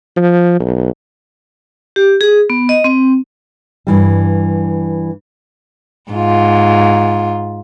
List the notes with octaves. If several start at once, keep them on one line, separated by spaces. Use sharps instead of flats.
F3
B1
G4
G#4
B3
D#5
C4
G2 E3 G3
G#2 F4